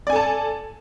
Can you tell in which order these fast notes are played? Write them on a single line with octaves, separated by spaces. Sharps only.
D5 G#5 A4 A5